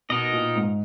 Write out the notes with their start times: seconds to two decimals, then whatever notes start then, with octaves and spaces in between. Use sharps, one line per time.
0.09 B2 B3 D#4 A#4 D#5
0.32 A#2
0.55 G#2